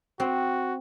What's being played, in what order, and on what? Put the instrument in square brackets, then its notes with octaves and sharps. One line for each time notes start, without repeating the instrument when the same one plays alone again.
[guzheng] C4 [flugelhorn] F#4